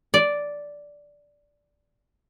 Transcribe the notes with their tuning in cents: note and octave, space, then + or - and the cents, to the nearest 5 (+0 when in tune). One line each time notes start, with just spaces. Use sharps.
D5 -5